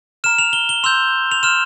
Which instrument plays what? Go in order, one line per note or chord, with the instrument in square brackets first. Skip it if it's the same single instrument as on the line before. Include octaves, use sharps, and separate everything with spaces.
[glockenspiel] A#5 F6 E7
F7
G7
G7
C6 E6 G6 F7
F7
C6 F6 E7